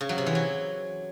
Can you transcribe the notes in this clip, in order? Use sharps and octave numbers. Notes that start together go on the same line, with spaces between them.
C#3
F#3
C3
E3
F#3